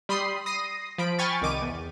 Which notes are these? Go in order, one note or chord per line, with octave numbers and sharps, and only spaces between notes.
G3 B5 C6 D#6 C7
D#6 A#6 C7 D#7
F3 B5 D7
G5 G#5 B5 C#6 F6 A6
C2 D#3 D6 D#7
E2